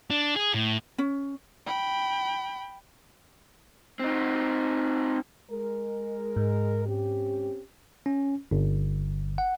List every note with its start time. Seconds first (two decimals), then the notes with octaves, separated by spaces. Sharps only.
0.10 D4
0.36 G#4
0.54 A2
0.98 C#4
1.66 G5 B5
4.00 C4 D#4
5.51 G#3 A#4
6.36 G#2
6.86 C4 C#4 G4
8.06 C#4
8.51 G1
9.38 F#5